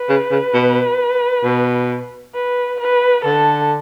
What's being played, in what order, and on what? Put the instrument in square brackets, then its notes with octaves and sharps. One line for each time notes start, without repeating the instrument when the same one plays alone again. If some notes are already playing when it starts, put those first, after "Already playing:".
Already playing: [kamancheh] B4
[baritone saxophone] C#3
C#3
B2
B2
[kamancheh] B4
B4
[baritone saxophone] D3 [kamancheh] A4